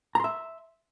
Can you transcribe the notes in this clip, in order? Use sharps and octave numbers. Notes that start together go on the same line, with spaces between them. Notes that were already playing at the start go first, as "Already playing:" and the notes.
E5 A#5 C6